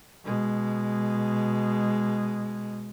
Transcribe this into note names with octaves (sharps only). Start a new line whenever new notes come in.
B2 G#3